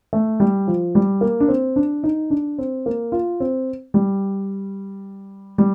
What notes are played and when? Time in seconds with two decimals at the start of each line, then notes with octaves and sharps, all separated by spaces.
0.13 A3
0.40 G3
0.67 F3
0.95 G3
1.21 A#3
1.40 D4
1.48 C4
1.76 D4
2.04 D#4
2.30 D4
2.58 C4
2.86 A#3
3.12 F4
3.40 C4
3.94 G3
5.58 G3